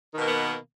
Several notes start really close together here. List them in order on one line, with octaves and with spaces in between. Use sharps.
D#3 B2 A#3 B3